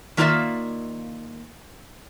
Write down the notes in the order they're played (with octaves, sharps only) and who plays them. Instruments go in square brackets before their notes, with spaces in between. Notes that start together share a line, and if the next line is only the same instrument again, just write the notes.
[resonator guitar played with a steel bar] D#3 A#3 F4 B4 D5 E5